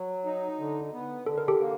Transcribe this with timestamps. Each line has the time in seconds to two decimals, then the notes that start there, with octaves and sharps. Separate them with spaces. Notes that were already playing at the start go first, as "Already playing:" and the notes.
Already playing: F#3
0.25 D#4
0.60 D3
0.93 B3
1.26 D3 A4
1.38 A#4
1.48 G4 A4
1.61 A#3